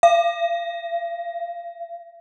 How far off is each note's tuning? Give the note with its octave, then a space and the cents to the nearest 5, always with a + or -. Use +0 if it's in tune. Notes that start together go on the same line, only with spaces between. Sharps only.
F5 -35